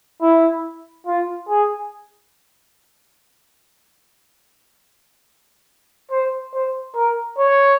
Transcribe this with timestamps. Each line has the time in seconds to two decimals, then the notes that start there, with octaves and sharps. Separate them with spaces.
0.21 E4
1.06 F4
1.49 G#4
6.11 C5
6.53 C5
6.95 A#4
7.38 C#5